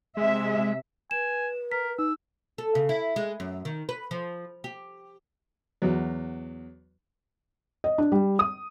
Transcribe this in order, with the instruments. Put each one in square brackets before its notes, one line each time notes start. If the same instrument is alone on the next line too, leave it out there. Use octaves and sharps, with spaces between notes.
[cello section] C3 E5 [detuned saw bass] G#3
[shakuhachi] B4 [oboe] G#5 [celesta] E7
[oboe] A#4 [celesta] B6
[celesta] D#4 [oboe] E6
[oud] A4
C#3
E4
G#3
F#2
D#3
B4
F3
G4
[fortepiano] E2 F#3
[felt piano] D#5
D4
G3
D#6